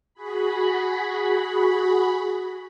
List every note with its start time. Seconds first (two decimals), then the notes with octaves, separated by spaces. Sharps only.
0.14 F#4 G#4 B5